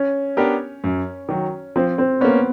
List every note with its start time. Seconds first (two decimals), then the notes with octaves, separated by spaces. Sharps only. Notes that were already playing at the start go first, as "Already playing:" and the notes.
Already playing: C#4
0.37 B3 D4 G4 A#4
0.84 F#2
1.29 D#3 F#3
1.76 F3 C4
1.98 C4
2.21 A#3 B3 C#4